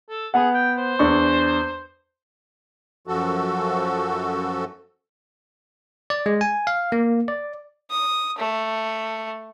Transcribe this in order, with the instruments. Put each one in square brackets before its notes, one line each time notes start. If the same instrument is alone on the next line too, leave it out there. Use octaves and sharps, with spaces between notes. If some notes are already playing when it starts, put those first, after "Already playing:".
[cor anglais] A4
[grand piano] B3 F#5 [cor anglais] G#4
[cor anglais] G5
C5
[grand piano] E2 D4 C#6
[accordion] F#2 F3 F#4 A4
[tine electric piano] D5
G#3
G#5
F5
A#3
D5
[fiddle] D#6
A3